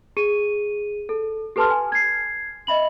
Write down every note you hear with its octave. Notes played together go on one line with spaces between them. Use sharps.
G#4 D#7
A4
G4 A4 B4 A5 C6 F6
G#5
G#6 C7
D#5 E5 B5 F#7